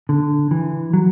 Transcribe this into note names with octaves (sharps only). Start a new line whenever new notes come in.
D3
E3
F#3